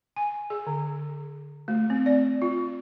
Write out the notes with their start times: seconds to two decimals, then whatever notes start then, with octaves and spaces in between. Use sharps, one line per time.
0.16 G#5
0.50 G#4
0.67 D3
1.68 A3
1.90 C4
2.06 D5
2.42 F4